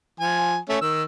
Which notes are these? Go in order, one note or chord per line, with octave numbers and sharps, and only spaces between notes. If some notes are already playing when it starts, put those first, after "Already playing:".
F3 G#5
A3 C#4
D#3 E6